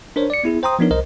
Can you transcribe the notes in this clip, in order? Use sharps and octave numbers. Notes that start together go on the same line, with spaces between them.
D4 A#4 C5 C#5
D5 C#7
B3 E4 G#4
C5 G5 A#5 C6 D#6
F3 B3 D4 D#4 A#4 C#5
C2 A#4 C5 D#5